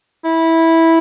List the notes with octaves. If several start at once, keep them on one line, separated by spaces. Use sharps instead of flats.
E4